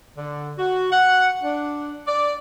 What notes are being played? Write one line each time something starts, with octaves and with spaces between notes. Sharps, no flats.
D3
F#4
F#5
D4
D5